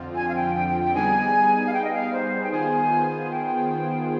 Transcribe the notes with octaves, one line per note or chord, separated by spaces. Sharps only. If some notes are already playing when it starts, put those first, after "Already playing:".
Already playing: F2 D3 F3 C4 F4
G#5
F5
G5
G5
G5
G5
G3 B3 D#4 G#4 G#5
F5
G5
D#5
F5
C5
G5
D#3 B3 F4 G#4 C5 G#5
G5